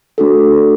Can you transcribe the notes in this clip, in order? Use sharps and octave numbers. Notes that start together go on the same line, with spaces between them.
A3 D4 F#4 A4